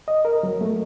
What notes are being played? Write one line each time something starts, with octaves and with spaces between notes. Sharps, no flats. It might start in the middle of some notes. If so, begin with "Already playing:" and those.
D#5
A#4
F#3
A3